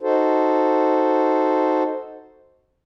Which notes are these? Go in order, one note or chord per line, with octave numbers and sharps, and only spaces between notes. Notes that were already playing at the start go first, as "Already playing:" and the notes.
D#4 F#4 A4 C5